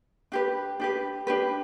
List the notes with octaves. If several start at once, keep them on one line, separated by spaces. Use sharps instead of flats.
D4 G4 B4
D4 G4 B4
D4 G4 B4